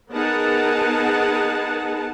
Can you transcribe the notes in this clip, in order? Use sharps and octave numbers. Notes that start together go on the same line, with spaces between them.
B3 D#4 G#4 A#4 F#5 A5